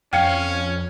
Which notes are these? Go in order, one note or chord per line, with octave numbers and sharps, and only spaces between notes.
F2 C#4 F5 G5 G#6 C#7